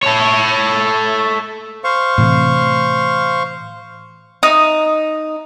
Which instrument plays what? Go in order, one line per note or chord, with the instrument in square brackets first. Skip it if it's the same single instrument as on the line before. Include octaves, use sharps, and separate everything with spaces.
[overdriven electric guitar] A4 C#5
[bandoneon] C5 F5 C#6
[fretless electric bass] A2 C3 [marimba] E3
[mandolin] D#4